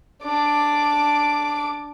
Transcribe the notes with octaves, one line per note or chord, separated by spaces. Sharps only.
D4 D6